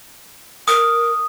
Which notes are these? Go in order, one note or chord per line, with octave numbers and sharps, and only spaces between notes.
A#4 D#6